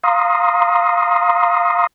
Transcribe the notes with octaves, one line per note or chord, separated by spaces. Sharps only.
F5 A#5 C6 D#6